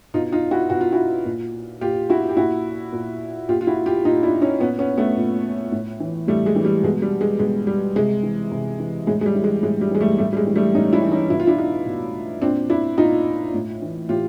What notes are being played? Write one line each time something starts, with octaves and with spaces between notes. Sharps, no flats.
B2 D#4 F4
D#4 F4
E4 F#4
B2 F#4
F4
E4 F#4
A#2
A#2 F4 G4
E4 F#4
G4
A#2 E4 F#4
A#2
A#2 F4 G4
F4
E4 F#4
F4 G4
A#2 D#4 F4
D4 E4
C#4 D#4
A#2 B3 C#4
B3 C#4
A3 B3
A#2
A2
E3
A2 G3 A3
G#3
E3
G3
B2 G#3
G3
G#3
B2 G#3
G3
C3 G#3
E3
C3
E3
A2 G#3
G#3
G3
E3
G#3
A2 G#3
G3
E3 G#3
G3 A3
A2 G3 A3
G3
G#3
E3
G3 A3
A2 C#4 D#4
D4 E4
E3
C#4 D#4
B2 E4
F4
D4 E4
D#4 F4
B2
A#2 C4 D4
D4 E4
A#2 D#4 F4
A2
E3
A2 F4 G4